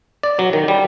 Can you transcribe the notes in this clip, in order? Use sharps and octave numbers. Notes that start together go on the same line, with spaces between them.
D5
F#3
D#3
G3